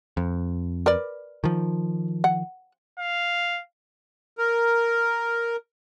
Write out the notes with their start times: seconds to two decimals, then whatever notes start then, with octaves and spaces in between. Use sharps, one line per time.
0.17 F2
0.86 A#4 B4 D5
1.44 D#3 F3
2.24 F#5
2.99 F5
4.38 A#4